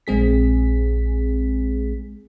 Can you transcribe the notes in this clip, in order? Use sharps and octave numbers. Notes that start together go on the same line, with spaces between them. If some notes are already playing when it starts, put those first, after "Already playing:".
A#1 G#3 C4 G#4 B6